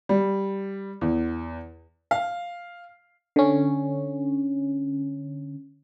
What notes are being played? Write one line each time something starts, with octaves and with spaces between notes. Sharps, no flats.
G3
E2
F5
D3 C#4